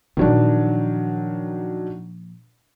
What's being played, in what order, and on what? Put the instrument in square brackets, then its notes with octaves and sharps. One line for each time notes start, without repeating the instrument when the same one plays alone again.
[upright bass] A#2 F3 [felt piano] D#3 F#3 D4